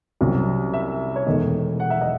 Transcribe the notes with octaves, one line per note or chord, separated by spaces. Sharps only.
C2 C3 F#3 C#4
E5
C#5
E1 E2 D#3 A3 D#5
F#5
E5
D#5